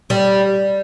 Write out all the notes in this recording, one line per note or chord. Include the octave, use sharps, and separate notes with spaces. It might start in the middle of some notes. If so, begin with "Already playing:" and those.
G3